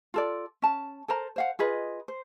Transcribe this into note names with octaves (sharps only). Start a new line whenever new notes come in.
F4 A4 D5
C#4 A5
A4 A#4 C5 A#5
C5 F5 F#5
F4 G#4 B4 D#5
C5